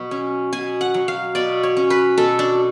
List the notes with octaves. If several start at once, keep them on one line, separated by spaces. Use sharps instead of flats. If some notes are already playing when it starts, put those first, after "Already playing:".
Already playing: B2 F#3
C#4
B2 G#5
F#5
F#3
F5
B2 D5
C#5
C#4
B4
B2 A4
D4